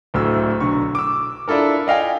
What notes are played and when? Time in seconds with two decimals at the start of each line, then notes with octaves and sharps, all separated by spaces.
0.14 D1 D2 A3 E6
0.60 B1 D3 C#6
0.95 D6 E6
1.48 D4 E4 F4 A4 A#4
1.87 D5 D#5 F5 G5 G#5